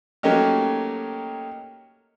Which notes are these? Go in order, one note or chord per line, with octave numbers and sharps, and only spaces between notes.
F#3 A3 A#3 C#4 D#4 G4